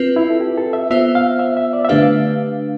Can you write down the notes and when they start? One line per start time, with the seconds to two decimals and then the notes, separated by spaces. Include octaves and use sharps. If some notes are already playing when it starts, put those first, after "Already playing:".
Already playing: C4 F4 B4
0.16 E4
0.30 A4
0.40 G4
0.57 A4
0.73 E5
0.90 B3 F4 C5 E5
1.15 F5
1.39 E5
1.57 E5
1.73 D5
1.84 E5
1.89 D3 A3 D4 G4 B4 F5